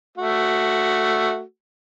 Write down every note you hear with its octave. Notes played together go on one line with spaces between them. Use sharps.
A3 F#4